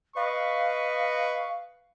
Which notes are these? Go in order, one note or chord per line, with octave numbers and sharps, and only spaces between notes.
B4 D#5 F5 C#6